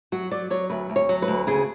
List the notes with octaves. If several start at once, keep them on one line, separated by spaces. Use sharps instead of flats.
F#3 F#4
F#3 D5
F#3 C#5
D2 B4
D2
C#5
F#3
B4
D2
C#3 G#4